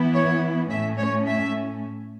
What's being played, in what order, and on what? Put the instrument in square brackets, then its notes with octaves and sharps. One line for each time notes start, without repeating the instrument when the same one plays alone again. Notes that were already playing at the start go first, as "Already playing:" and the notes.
Already playing: [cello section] E3 B3 E4
C#5
A2 A3 C#4 E5
C#5
E5